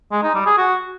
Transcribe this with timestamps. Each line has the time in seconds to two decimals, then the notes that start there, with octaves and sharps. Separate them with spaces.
0.12 G#3
0.23 D#4
0.35 G3
0.46 G#4
0.58 F#4